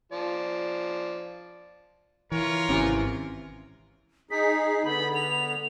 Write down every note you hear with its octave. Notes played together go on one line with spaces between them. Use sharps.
F3 D5
E3 F4 A#4 C#5
G#1 F#2 C3 E3
D#4 G#4 B6
D3 B3 B5
F7